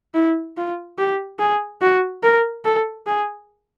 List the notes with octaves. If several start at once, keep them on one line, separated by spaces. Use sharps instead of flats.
E4
F4
G4
G#4
F#4
A#4
A4
G#4